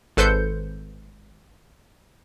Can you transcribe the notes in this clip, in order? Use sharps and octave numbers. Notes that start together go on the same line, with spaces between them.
G#1 A4 B4 C5 G6 C#7